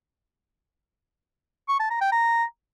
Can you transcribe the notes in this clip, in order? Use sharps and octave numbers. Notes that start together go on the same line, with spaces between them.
C#6
A5
A#5
G5
A#5